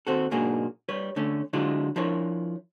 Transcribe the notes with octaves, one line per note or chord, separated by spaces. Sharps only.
D#2 C4 F#4 A4
B1 G#2 A#3 D4 F#4 G#4
G3 B4 C#5
D3 A3 C#4
D3 F#3 G#3 E4 F4
F3 D4 E4 A#4 C#5